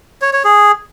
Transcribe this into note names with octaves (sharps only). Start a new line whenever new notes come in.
C#5
C#5
G#4